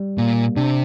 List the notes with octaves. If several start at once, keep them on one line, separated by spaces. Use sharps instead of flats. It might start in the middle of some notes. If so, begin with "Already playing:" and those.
Already playing: G3
A#2 A#3
C3 D4